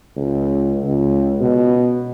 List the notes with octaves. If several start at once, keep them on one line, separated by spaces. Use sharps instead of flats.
C#2
C#2
B2